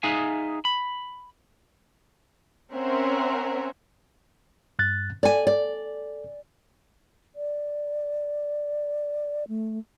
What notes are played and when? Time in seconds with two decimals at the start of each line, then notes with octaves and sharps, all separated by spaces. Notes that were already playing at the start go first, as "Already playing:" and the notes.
0.03 D#4 G#4 E5 F5 G#5
0.65 B5
2.74 C4 C#4 A#4 C5 E5 F#5
4.79 G2 F#6 A6
5.23 A4 D5 G#5
5.47 D5
7.35 D5
9.48 A3